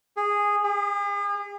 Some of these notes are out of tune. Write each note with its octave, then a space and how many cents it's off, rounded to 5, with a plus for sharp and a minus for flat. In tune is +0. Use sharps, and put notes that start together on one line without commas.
G#4 -10
G#4 -45